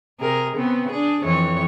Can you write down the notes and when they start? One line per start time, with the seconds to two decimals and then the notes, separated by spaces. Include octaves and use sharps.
0.19 C3 G#4 A#4
0.55 C#3 B3 C4
0.91 D4 G#4
1.24 F2 E3 C#5